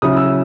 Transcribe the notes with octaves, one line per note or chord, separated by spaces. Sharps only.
C#3 F#3 C#4 E4 D#6
E6